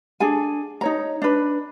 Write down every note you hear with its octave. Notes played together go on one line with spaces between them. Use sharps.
D4 G#4 A4 G#5
D#4 C#5 A#5
D4 B4